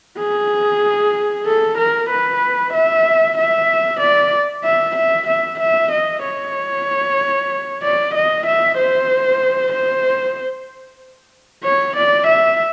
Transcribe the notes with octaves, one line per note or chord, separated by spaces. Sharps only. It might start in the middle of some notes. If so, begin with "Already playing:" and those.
G#4
A4
A#4
B4
E5
E5
D5
E5
E5
E5
E5
D#5
C#5
D5
D#5
E5
C5
C5
C#5
D5
E5